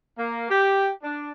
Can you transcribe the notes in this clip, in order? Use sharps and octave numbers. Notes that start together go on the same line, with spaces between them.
A#3
G4
D4